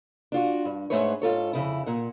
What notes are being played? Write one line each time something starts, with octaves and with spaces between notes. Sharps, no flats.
D4 F4 F#4
G2
G#2 B2 A3 G#4 B4 C#5
G#2 F4 A4 C#5
F2 G#2 C#3 E4
A#2 F#5